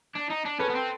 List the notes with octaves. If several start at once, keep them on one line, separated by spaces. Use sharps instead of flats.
D4
D#4
D4
C#4 A4 B4
B3
C4